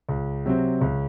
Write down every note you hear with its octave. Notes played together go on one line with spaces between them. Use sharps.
C#2
C3 F#3 C4
C#2